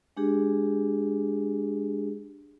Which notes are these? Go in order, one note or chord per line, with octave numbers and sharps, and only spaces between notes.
G#3 D4 G4 G#4